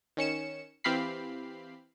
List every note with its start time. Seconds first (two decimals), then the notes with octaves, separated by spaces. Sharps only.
0.17 D#3 C#4 C#7 E7
0.84 E3 C4 G4 F5 B5 C7